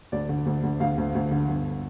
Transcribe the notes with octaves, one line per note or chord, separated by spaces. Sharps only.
D2 D5
D3
D2
D2
D2 F5
D2
D2
D3
G1